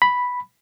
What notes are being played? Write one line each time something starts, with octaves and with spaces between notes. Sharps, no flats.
B5